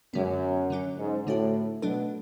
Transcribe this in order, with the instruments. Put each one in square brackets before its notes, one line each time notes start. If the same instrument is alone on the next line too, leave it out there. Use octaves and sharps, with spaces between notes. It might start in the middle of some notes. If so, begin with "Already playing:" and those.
[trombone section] F#2 [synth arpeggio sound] D3 G#3 B3
[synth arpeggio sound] D3 F#3 C#4
[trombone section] G#2
[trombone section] A2 [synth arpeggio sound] D3 A3 D4 F#4
[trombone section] B2 [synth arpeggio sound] F#3 A3 D4 A4